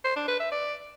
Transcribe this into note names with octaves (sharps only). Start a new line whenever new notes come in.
C5
D4
B4
E5
D5